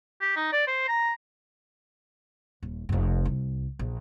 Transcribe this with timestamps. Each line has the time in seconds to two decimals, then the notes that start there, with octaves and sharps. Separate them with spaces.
0.22 G4
0.36 D#4
0.52 D5
0.67 C5
0.88 A#5
2.63 D#1
2.89 F1 F2
3.25 C2
3.79 A#1